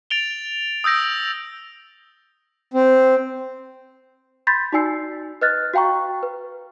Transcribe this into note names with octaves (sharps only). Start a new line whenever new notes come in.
A6 D7 F7 G7
D#6 E6 G6 A#6 D7
C4
B5 C6 G6 A6 B6
D#4 F#4 D5 G#5 E6 C7
B4 D#5 F6 F#6 A6
F#4 F5 G5 A#5 C#6
B4